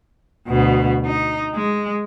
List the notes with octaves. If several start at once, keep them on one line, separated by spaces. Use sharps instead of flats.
D2 B2
D#4
G#3